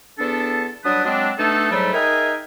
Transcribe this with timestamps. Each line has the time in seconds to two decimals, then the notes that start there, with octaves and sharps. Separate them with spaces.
0.19 E2 B3 D4 A4
0.85 F#3 G3 D4 B4 D#6
1.05 F#3 G#3 C4 D4
1.39 B2 A3 D4 D#4 A4
1.71 G#2 F#3 G3 A3
1.93 D#4 G#4 A#4 E5 G5 G#5